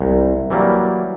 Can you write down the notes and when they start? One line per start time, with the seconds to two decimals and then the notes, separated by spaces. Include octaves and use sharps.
0.01 C2
0.50 E3 F#3 G3 A#3